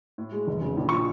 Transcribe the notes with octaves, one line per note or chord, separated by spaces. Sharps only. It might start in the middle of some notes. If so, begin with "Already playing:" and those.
A2
G#3
F1
C#3
A#1
F3 C#6